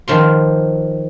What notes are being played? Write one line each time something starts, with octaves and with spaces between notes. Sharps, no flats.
D#3 F3 C6